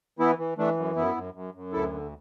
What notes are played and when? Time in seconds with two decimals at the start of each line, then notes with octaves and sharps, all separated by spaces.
0.19 E3 B3 E4
0.38 E3
0.58 E3 A3 D4
0.77 F#2
0.96 F#2 B3 E4
1.16 F#2
1.34 F#2
1.54 F#2
1.73 D2 E4 A4
1.93 D3